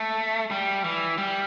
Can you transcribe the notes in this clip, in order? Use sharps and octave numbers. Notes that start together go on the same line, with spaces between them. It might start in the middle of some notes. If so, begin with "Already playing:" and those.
Already playing: A3
G3
E3
G3